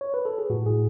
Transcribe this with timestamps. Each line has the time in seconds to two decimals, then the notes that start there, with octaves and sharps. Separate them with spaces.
0.01 C#5
0.14 B4
0.25 A4
0.38 G#4
0.50 A2 F#4
0.66 A2 G#4